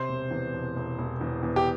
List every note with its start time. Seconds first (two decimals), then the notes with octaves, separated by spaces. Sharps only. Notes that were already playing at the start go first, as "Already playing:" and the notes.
Already playing: C3 C5
0.08 E1
0.31 E2
0.53 E1
0.76 E1
0.98 E1
1.21 E2
1.43 E2
1.56 G4